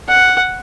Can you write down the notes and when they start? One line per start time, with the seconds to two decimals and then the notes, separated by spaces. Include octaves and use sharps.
0.09 F#5